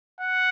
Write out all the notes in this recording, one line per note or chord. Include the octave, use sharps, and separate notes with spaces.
F#5